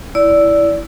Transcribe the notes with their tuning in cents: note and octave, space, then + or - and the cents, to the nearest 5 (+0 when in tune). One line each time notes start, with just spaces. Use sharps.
E4 +0 D5 -20